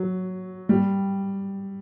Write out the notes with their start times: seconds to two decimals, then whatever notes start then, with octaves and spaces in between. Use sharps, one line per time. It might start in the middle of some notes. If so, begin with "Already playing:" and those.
Already playing: F#3
0.69 G3